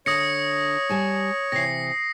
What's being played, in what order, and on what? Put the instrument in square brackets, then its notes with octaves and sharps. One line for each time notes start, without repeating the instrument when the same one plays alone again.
[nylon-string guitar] D3 [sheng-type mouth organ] C#5 [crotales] D#6 A#6 C#7
[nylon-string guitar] G3 G#5 A5
[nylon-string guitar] C3 E3 [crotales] A#6 C7